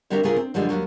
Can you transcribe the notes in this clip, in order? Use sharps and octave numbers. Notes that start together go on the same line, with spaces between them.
D3 G3 C4 F#4 A#4 E5
D2 C#3 A3 F4 G#4 A#4
C4
F#2 D3 F3 G3 G#3
D#2 F#3